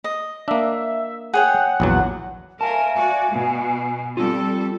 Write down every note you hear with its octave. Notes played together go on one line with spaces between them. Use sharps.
D#5
A#3 D4 E5
G#4 C#5 F#5 G5
A#1 E2 F#3
A#4 E5 F5 G#5 A5
F#4 D5
B2
G3 C4 F4 A4